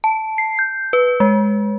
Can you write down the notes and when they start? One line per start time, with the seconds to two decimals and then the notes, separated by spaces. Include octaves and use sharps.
0.04 A5
0.38 C7
0.59 G6
0.93 B4
1.20 G#3